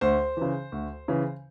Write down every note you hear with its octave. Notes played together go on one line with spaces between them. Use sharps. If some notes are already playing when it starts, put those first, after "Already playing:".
D2 C5
C#3 E3
D2
C#3 E3